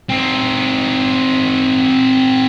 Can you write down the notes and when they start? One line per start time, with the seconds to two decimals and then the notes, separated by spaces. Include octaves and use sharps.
0.09 C4 D#4